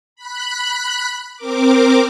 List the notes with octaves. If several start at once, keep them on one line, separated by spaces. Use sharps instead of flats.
B5 F#6
C4 A#4 D6